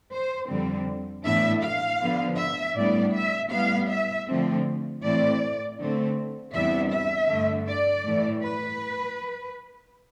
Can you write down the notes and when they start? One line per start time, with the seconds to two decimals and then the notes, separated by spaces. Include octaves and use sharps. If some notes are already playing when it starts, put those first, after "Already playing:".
0.12 C5
0.49 F2 D3 G3 C4
1.25 A2 E3 B3 D4 E5
1.63 F5
2.01 D3 F3 B3
2.38 E5
2.76 A2 G3 B3 D4 D5
3.14 E5
3.52 A2 G3 B3 F5
3.89 E5
4.27 D3 F3 A3 C4
5.03 A2 E3 A3 C4 D5
5.79 D3 A3 C4
6.54 E2 C3 G3 B3 D4 E5
6.91 E5
7.29 G2 D3 A3
7.67 D5
8.05 A2 E3 A3
8.43 B4